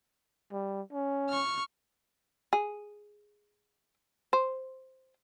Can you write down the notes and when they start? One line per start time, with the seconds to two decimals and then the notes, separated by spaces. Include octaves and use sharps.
0.52 G3
0.93 C#4
1.29 C#6 F6
2.53 G#4
4.33 C5